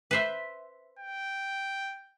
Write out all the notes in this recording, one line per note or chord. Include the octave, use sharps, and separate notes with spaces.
B4 C5 E5
G5